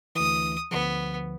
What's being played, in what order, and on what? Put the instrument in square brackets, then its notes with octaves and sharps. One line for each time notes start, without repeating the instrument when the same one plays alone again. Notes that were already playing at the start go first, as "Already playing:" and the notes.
[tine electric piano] D2 E3 [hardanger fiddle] D#6
[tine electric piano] D2 D3 F3 [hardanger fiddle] B3